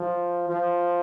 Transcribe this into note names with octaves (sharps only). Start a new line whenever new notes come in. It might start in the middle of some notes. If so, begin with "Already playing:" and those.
Already playing: F3
F3